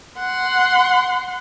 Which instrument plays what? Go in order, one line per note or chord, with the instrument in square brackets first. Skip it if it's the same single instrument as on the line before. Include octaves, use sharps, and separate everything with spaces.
[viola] F#5 C6